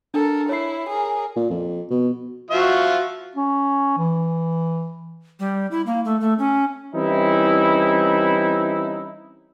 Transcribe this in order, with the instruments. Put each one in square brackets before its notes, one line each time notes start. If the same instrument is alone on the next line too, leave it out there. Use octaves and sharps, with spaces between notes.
[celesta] D4 [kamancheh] A4 A#4
[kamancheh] E4 [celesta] C#5 C7
[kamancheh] G#4 A#4
[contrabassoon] A#2
F2
B2
[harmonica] F3 F4 E5 [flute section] F#4
[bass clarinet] C#4
E3
[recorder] G3
E4
A#3
A3
A3
C#4
[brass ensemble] E3 G3 C4 C#4 D#4 E4